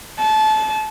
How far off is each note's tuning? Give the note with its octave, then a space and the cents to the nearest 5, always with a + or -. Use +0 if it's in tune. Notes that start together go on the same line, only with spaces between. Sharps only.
A5 -25